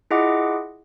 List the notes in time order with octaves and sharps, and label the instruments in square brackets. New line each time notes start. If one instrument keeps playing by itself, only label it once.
[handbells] E4 F4 G#4 D#5 F#5 D6